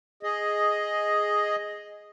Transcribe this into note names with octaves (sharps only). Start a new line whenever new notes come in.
G#4 D#5